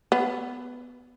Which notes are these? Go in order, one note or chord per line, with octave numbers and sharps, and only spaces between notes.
B3